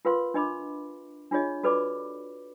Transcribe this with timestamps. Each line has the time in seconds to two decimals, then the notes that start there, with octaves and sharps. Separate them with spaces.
0.05 F4 A#4 B4 F5 C6
0.34 D4 D#5 B5 D6
1.31 D4 F4 G#4 C#5 D#5
1.63 F#4 A4 B4 D5 B5 D6